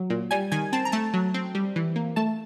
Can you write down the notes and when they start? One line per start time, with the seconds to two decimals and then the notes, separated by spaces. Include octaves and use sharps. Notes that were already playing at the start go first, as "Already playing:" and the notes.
Already playing: F#3
0.10 A#2
0.31 G3 G#5
0.52 D#3 G#5
0.73 C4 A5
0.85 A#5
0.92 A3 A5
1.14 F#3
1.34 C4
1.55 G3
1.76 E3
1.96 A#3
2.16 A3 A5